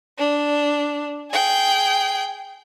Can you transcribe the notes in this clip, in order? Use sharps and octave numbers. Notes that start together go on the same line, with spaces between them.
D4
G#4 G5